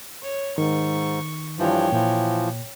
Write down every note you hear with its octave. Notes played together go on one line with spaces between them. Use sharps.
C#5
G#2 D#3 C#6
G2 E3 F3 C#5 G5
A#2 E3 F3